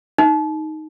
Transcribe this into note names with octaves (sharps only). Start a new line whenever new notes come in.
D#4